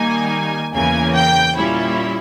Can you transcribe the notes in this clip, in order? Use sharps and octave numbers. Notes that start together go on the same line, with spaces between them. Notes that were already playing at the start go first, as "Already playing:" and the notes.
Already playing: D#3 G3 A#3 D#4 G#5
E2 C#3 E3 A#3 G#5
G5
A#2 G3 C#4 E4